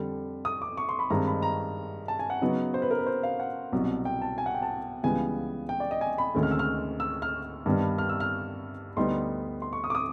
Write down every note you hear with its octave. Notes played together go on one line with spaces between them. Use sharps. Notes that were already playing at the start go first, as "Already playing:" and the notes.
Already playing: F2 D3 G3
D#6
D6
C#6
C6
B5
G2 D#3 G#3 C4 A#5
B5
A#5
A5
G#5
F#5
C#3 F#3 B3 D#4
C5
B4
A#4
B4
C5
F5
F#5
C2 B2 F#3
G5
A5
G#5
F#5
G5
A5
C#2 C#3 E3 G3 B3 G#5
G5
D5
D#5
G#5
B5
D2 C3 D#3 G#3 C#4
F6
E6
F6
E6
F6
G2 D#3 G3 B3 D4
F6
E6
F6
D2 D3 G3 B3 D#4 C6
C6
C#6
D#6
D6
D#6